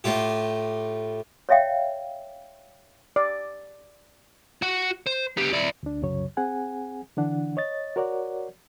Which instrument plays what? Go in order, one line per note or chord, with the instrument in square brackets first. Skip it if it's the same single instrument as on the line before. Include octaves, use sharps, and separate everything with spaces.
[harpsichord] A2 F4 G4
[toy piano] C#5 D5 E5 F5 G5
[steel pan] D5
[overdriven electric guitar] F#4 F#5
C5
B3 G4
E4 D5
[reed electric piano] D2 D4
C2 F#2 C#3 F#3 C#5
C4 G#4 F#5 G#5
D3 E3 D4 F#5
C#5 D#5 A6
F#4 A#4 C#5 D5 F#5